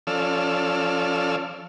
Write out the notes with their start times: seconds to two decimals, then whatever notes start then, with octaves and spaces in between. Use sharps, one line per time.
0.07 F3 C#4 A4 D5 E6 F6